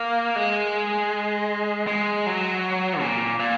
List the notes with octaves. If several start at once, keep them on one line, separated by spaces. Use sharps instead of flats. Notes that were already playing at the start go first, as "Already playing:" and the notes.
Already playing: A#3
G#3
G#3
F#3
A#2
A#2